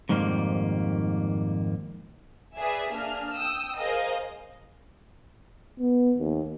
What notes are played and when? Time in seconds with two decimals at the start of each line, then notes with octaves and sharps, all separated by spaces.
0.09 F2 G#2 D#3 G3 A#3
2.57 G#4 B4 D5 E5 G#5
2.92 A#3 D4 G#4 F6
3.34 G5 D#6 E6
3.78 G#4 A#4 C5 D#5 F5
5.80 B3
6.18 D#2